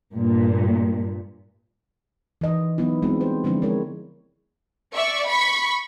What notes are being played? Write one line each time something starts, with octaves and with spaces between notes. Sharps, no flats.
G2 A#2
E3 D#5
F#3 B3 D#4 E4
G3 G#3 B3 C4 F4 F#4
C5
D3 F3 G#3 C4 D4 E4
G#3 E4 A#4 C#5
D5 E5 C#6
B5 C#6 B6